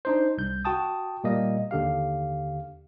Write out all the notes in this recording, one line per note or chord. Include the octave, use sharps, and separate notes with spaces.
D4 D#4 C5
C2 G6
F#4 G5 A5 D#6
A#2 G3 A#3 D#5
D#2 D3 G4 F5